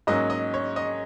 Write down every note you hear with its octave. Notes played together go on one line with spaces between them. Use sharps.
G#2 F#3 A#3 C#4 D#5
D#5
C#5
D#5